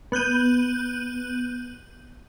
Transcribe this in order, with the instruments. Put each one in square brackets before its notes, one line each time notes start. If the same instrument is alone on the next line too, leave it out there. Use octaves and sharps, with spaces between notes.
[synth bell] B3 F#6 G6 D#7